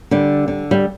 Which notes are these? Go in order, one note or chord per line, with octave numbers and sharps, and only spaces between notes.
D3 G3
D3
G3